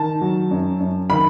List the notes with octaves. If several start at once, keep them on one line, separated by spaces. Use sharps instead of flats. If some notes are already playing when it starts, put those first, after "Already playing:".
Already playing: D#3 A5
F#3
F#2
F#2
D#3 B5